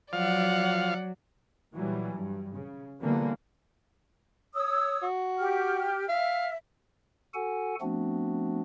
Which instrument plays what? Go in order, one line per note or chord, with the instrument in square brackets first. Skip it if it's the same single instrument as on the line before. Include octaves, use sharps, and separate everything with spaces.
[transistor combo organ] F3 F5 [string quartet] F#3 [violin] D5 F#5
[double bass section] A#2 E3 F#3 G3
G2
C#3
D3 E3 F#3 G3 A#3 B3
[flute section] C#5 D#6 E6
[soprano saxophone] F#4
[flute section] G4 F6
[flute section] E5 [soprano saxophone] F5
[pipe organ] F#4 A4 F#5 G#5
F3 A3 B3 C4 D4 F#4